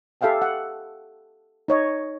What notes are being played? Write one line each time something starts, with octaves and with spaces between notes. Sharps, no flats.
G4 A4 E5 F5 G5 G#5
F#5
D#4 C#5 D#5